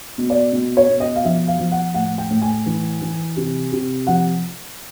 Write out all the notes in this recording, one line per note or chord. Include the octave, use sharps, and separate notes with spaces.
B2
D5
B2
C#5
B2
D#5
F5
F3 E5
F5
F3
F#5
A2 F#5
G5
A2
G#5
E3
E3
C3
C3
F3 F#5